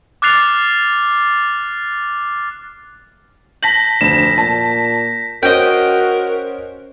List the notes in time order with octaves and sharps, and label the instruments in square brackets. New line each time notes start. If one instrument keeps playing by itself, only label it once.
[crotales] D6 F6 F#6 A6 C7 F7
[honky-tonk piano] A5 F#7 [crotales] G6 A#6 B6
[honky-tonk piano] F1 E7 [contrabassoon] D2
[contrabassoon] A#2 [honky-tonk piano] A5
[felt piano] C#4 C5 [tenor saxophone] F#4 [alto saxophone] A#4 [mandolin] D#5 G5